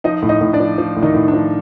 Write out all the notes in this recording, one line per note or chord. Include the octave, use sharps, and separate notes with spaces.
F3 D#4 D#5
A2
D#4 D#5
A2
D4 D5
F3
F3
A2
D#3 D#4
A2
D4
F3